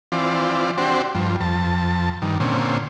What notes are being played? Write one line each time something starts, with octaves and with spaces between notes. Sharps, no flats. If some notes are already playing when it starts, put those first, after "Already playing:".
E3 C4 F4 D5
C4 D4 F#4 G4 C5
G2 F3
F2 A5
G2 D#3
A#2 D3 C4 C#4